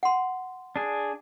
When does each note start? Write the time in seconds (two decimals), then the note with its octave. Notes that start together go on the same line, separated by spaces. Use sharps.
0.03 F#5 C6
0.76 D4 G#4